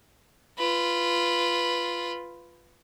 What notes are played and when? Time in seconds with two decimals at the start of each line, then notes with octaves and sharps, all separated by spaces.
0.58 F4 B4